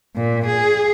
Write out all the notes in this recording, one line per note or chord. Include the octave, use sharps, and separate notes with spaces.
A#2
G#4